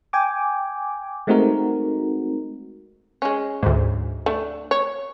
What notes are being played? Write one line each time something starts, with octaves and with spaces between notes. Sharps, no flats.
G5 G#5 D6
G#3 A3 C4 D#4 F#4 A#4
G#3 C#4
D2 G#2
A3 D4
C#5